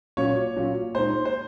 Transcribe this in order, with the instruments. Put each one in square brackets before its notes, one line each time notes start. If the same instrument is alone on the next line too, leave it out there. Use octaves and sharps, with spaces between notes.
[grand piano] A#2 F#3 C#4 F4 [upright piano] C#5
[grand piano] A#2 F#3 C#4 F4
[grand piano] A#2 G#3 D#4 [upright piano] C5
[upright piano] C5